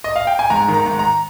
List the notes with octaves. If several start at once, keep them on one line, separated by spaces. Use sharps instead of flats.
D#5
F5
G5
G#5
G#2 A#5
D#3
A#5
G#2
A#5